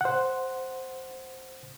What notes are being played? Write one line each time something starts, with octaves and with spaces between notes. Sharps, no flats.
C5 F#5